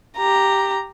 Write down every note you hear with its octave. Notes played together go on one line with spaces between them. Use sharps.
G4 A#5